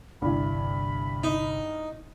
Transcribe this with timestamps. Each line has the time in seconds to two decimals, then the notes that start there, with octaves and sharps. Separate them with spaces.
0.22 G1 C2 G2 E3 D4 B5
1.24 D#4